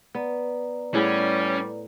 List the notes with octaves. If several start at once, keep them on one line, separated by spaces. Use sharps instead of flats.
B3 B4 D5 A#5
A2 G3 C#4 G#4 F#5